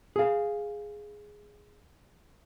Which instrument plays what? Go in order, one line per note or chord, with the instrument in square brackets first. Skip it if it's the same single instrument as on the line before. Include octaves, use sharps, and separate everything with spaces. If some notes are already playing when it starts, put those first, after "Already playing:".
[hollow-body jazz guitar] G#4 F5